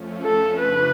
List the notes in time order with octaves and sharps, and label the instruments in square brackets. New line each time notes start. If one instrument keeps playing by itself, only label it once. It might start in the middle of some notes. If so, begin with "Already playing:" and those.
Already playing: [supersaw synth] F2 F3 A3 C#4
[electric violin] A4
[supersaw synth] F2 C#3 F3 A3 D4 [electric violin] B4